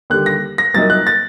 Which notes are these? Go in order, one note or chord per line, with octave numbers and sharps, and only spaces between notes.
D#2 D3 G3 F#6
A#6
A#6
C2 A#2 F#3 A#3 D#4 A6
F#6
A6